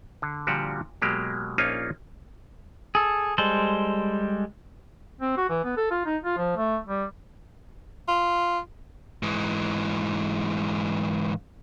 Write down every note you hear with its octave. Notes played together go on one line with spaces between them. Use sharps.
D3
A#2 D3 F3 G3 F#4 G4
B2 F#3 G#3 A#3 G4
A#1 A#3 C#4 D#4 F4 G#5
G#4 A4
G3 G#3 A4 C5
C4
F#4
E3
B3
A4
F4
D#4
F4
F3
A3
G3
F4
G#2 E3